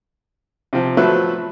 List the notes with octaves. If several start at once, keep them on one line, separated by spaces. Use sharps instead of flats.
C3 F3
F3 F#3 A3 B4 E5